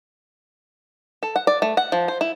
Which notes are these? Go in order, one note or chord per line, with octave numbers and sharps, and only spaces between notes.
A4
F#5
D5
A3
F#5
F3
C5
E4